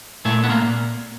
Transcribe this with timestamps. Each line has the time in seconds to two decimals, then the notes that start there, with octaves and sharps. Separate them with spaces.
0.25 A#2 A3
0.44 B3
0.50 A#3